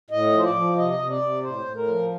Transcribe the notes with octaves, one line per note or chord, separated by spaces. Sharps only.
A2 D#5
F3 C5
D5
F3
C3 D#5
C3
D5
C3
A2 C5
A2
A#4
F3